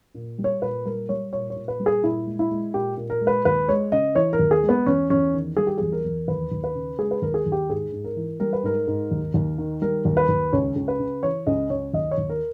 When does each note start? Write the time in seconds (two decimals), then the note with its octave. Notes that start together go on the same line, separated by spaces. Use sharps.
0.15 A#2
0.38 G3
0.44 C#5
0.62 A#2 B4
0.85 G3 A#4
1.09 G3 C#5
1.33 A#2 C#5
1.50 C#5
1.56 A#2
1.68 B4
1.80 G3
1.86 G#4
2.03 A#2 E4
2.27 G#3
2.39 E4
2.51 G#3
2.74 A#2 G4
2.97 A#2
3.10 A#4
3.21 G#3
3.27 B4
3.45 D#2 B4
3.68 G#3 C#5
3.92 C#3 D#5
4.15 E3 C#5
4.33 A#4
4.39 D#2
4.51 G#4
4.63 G#3
4.69 B3
4.86 E2 C#4
5.10 E2 C#4
5.33 D#3
5.57 G3 G#4
5.67 G4
5.78 E2 G#4
5.92 A#4
6.04 E2
6.28 D#2 B4
6.51 D#2
6.64 B4
6.75 C#3
6.98 G#3 G#4
7.11 B4
7.22 D#2 A#4
7.34 G#4
7.46 D#2
7.52 G4
7.69 G#2 G#4
7.92 G#2
8.04 A#4
8.16 E3
8.40 G3 A#4
8.53 B4
8.63 G#2 A#4
8.87 G#2
9.11 D#2
9.34 D#2
9.58 D#3
9.82 G3 A#4
10.05 D#2
10.17 B4
10.29 D#2
10.53 C#2 C#5
10.75 C#2
10.88 B4
10.99 C#3
11.23 E3 C#5
11.47 C#2 D#5
11.70 C#2 C#5
11.93 D#2 D#5
12.11 C#5
12.18 D#2
12.29 A#4